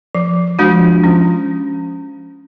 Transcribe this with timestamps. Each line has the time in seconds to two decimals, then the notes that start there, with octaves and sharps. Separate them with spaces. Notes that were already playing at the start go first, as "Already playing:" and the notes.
0.15 F3
0.58 F3 G#3 D4 F#4
1.03 F3 C#4